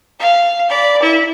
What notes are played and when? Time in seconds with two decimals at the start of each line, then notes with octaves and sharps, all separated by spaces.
0.19 F5
0.69 D5 B5
1.02 E4